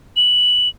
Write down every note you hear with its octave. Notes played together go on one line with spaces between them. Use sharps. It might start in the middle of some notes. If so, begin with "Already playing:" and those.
F#7